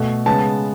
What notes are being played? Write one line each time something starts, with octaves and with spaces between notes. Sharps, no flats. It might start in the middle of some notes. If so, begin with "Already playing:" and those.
Already playing: B2 A3
C#3 G#3 B3 A5